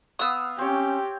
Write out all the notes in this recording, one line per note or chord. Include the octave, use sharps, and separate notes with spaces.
B3 F5 F#5 D#6 E6
C4 C#4 G4 C#5